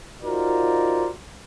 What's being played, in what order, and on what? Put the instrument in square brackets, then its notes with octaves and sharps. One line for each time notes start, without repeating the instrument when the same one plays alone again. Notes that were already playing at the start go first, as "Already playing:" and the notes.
[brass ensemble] D#4 F4 F#4 A#4 C5 D5